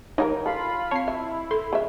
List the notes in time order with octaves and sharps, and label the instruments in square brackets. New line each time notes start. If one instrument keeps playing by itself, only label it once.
[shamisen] E3 F#4 A#4 [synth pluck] D#4 [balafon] C#5
[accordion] F4 F5 B5 [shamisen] A4
[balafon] C4 A5 [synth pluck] C#5 C7
[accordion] E4 [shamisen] E5
[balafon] A4 [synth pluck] C6
[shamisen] C#3 E5